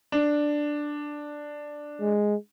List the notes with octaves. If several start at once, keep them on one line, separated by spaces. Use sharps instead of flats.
D4
G#3